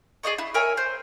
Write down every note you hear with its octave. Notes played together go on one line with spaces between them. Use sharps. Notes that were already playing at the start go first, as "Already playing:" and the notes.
G#4 D5 D#5 C#6
E4
A#4 C#5 E5 G#5
C5